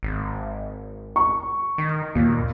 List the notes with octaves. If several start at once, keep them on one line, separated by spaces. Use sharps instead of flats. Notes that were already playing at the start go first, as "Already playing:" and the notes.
G#1
C#6
D#3
D#2 A#2